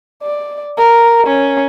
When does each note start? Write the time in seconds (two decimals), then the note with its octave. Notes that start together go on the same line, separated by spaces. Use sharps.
0.23 D5
0.78 A#4
1.27 C#4